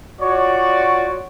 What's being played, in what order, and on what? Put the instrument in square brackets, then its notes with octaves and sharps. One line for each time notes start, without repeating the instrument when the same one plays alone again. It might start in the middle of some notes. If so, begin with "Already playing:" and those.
[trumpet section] F4 F#4 C#5 D5